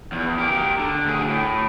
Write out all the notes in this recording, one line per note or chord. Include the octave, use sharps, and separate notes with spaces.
E2
G4 A#4
D3
D2 G#4
A2